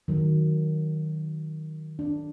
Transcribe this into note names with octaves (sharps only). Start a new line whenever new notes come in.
D#3 F#3
D4